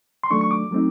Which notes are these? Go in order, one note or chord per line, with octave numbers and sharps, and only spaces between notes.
C6
D#3 F#3 A3 D4 C#6
C#6
D6
F#3 A3 C4 D#4